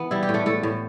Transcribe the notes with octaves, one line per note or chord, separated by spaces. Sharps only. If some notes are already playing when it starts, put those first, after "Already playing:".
Already playing: E3 B3
G3 E4
G4
A2
A3 A4
A2 A3 A4
A2